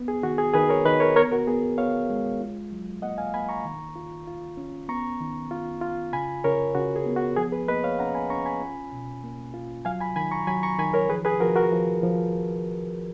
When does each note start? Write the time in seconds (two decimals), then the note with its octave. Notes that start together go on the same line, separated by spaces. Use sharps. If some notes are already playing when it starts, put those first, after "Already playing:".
Already playing: B3
0.08 G#4
0.23 D#3 F#4
0.38 G#4
0.54 D#3 G#4 B4
0.69 A#4 C#5
0.85 D#3 B4 D#5
1.00 A#4 C#5
1.16 B3 A#4 C#5
1.32 F#4 A#4
1.47 B3 G#4
1.78 B3 C#5 F5
2.10 G#3
2.40 F4
2.72 F#3
3.02 A#3 D#5 F#5
3.18 F5 G#5
3.34 A#3 G#5 B5
3.49 A#5 C#6
3.65 D#3
3.95 F4
4.27 F4
4.57 C#4
4.89 B3 A#5 C#6
5.20 D#3
5.51 F4
5.81 F4
6.13 C#3 G#5 B5
6.44 C#3 A#4 C#5
6.75 C#3 F#4
6.96 G#4
7.06 B3
7.16 F#4
7.37 F3 G#4
7.52 G#4 B4
7.68 A#3 B4 D#5
7.84 C#5 F5
7.99 C#4 F#5 A#5
8.15 G#5 B5
8.30 C#4 A#5 C#6
8.46 G#5 B5
8.61 F4
8.92 B2
9.24 A#3
9.54 F4
9.85 F#3 F5 G#5
10.01 G#5 B5
10.16 D#3 G#5 B5
10.32 A#5 C#6
10.47 F#3 G#5 B5
10.63 A#5 C#6
10.79 D#3 G#5 B5
10.94 A#4 C#5
11.09 F3 G#4 B4
11.25 G#4 B4
11.40 F3 F#4 A#4
11.56 F#4 A#4
11.72 F3
12.03 F3